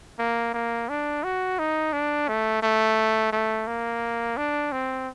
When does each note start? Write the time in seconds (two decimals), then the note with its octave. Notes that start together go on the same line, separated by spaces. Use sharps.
0.19 A#3
0.54 A#3
0.89 D4
1.24 F#4
1.59 D#4
1.93 D4
2.29 A3
2.62 A3
3.33 A3
3.67 A#3
4.37 D4
4.72 C4